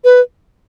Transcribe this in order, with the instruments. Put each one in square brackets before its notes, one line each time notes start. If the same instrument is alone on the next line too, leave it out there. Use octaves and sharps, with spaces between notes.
[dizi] B4